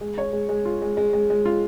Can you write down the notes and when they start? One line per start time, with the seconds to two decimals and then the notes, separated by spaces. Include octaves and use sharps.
0.01 G#3
0.18 C#5
0.33 G#3
0.49 G#3
0.65 F4
0.82 G#3
0.97 G#3
1.13 G#3
1.30 G#3
1.46 F4